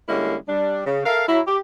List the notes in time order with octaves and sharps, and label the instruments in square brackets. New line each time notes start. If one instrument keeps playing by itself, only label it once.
[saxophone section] D3 G3 G#3 A#3 C#4 E4
G3 D4
C#3
A4 A#4 E5 F5
F#3 E4
G4